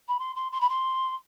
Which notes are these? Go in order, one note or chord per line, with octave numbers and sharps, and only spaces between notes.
B5
C6
C6
C6
B5
C6